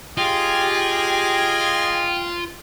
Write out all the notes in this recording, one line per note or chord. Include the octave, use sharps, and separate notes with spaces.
F4 G4 G#4 D#5 G5 G#5